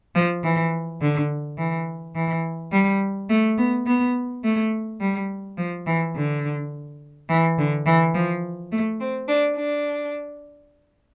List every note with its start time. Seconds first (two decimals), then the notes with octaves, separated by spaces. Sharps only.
0.15 F3
0.44 E3
1.01 D3
1.58 E3
2.15 E3
2.71 G3
3.30 A3
3.57 B3
3.87 B3
4.43 A3
5.00 G3
5.57 F3
5.86 E3
6.14 D3
7.29 E3
7.58 D3
7.86 E3
8.14 F3
8.72 A3
9.00 C4
9.29 D4
9.57 D4